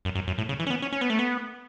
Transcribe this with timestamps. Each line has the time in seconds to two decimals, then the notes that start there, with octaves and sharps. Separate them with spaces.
0.05 F#2
0.15 F#2
0.27 F#2
0.38 A2
0.49 C#3
0.60 E3
0.67 C#4
0.70 B3
0.82 C#4
0.92 C#4
1.01 B3
1.10 A3
1.19 B3